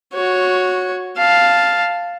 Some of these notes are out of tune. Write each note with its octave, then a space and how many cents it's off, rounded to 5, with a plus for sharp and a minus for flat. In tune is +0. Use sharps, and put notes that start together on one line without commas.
F#4 -15 C#5 +0
F5 +0 A5 +0